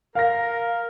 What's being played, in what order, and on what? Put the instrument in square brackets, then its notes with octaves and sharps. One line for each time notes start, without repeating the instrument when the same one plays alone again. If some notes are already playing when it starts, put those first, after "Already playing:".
[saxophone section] A#4 [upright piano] F5 A#6